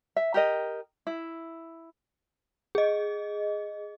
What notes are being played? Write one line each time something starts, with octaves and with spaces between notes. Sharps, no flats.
E5
G4 A#4 D#5
E4
G#4 D#5